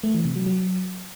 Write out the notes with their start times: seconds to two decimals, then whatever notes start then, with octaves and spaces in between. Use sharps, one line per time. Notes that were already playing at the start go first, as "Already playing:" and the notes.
0.04 A3
0.14 E3
0.25 C3
0.36 F#3
0.46 F#3